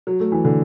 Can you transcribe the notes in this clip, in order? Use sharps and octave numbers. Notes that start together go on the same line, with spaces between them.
F#3
A3
E3
D3